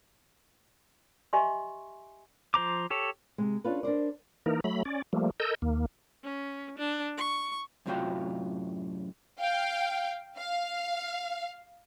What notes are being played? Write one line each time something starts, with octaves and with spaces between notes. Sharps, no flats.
G4 D#5 E5 G#5 C6 C#6
F3 C5 A#5 D6
G4 A4 C#5
C3 G#3
C#4 D4 F4 A4 B4
D4 A#4 C5 D5
E3 A#3 D#4 A#4
F#3 A3 B5
C#4 D5
F3 G3 A3 A#3
A4 A#4 D#5 E6 G6
D#2 A#3
C#4
D4
C#6
F#2 A2 C3 F4 F#4 G5
F5 G5
F5